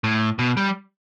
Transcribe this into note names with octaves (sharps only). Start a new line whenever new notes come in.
A2
B2
G3